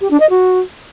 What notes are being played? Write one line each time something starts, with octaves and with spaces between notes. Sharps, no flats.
G4
D4
D#5
F#4